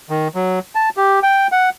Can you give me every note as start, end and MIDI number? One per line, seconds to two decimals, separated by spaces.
0.10 0.28 51
0.35 0.59 54
0.75 0.89 81
0.97 1.19 67
1.23 1.47 79
1.52 1.69 78